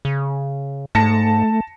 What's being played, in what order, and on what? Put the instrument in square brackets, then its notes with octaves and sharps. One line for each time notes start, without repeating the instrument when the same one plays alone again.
[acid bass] C#3
[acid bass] G#2 [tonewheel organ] A3 [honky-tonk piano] A5 A#6 C#7